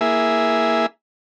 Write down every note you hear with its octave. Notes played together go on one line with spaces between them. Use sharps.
A#3 E4 G#4 E5